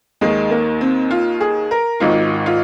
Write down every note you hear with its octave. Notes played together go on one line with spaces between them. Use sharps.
D#2 D#3 G#3
A#3
C4
F4
G#4
A#4
G#1 G#2 D#3 F4
F4